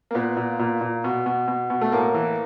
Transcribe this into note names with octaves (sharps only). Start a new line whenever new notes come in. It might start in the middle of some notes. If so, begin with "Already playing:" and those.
A#3
A#2 B3
A#2
A#2
A#2
B2
B2
B2
B2
A3
A2 A#3
E3